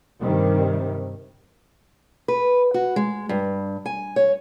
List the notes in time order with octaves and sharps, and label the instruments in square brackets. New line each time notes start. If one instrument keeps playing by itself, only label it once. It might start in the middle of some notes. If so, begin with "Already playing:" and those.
[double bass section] G2 C3 D#3 G3
[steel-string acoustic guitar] B4
F#4
G#3
G2
G#5
C#5